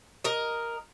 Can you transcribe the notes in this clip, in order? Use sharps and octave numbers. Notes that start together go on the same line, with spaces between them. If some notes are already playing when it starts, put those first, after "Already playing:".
A#4 D#5